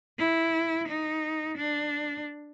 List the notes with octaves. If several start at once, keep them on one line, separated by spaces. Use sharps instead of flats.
E4
D#4
D4